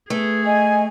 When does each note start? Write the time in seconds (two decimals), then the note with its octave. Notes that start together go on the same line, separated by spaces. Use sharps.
0.10 A3 G#4 B4
0.45 D#5 G#5